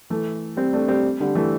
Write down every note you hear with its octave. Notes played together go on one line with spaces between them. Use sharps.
E3 A3
G3 C4
A3 D4
G3 C4
D3 G3
E3 A3